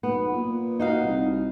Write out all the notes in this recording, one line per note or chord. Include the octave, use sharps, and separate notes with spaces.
B1 B3
A#2
D#4 F#4 F5
C2